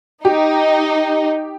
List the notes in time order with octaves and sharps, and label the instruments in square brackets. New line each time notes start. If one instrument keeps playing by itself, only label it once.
[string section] D#4 [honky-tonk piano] G4